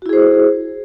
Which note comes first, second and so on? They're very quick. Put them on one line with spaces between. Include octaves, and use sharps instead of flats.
F#4 E4 G#4 C5